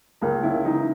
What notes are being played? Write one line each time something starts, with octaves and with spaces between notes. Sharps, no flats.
C#2 A#3
C#3 E4
E3 D#4